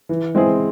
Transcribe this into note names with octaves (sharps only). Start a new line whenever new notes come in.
E3
G#3 C4 E4 G#4